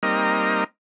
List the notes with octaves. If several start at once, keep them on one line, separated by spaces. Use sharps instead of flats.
G3 A#3 C4 D#4 A#4 D#5